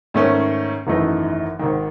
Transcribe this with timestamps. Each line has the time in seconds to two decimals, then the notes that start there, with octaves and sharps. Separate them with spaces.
0.14 G#2 D#3 A3 C#4
0.87 G#1 F#2 E3 A3 D#4
1.59 G#1 G#2 D#3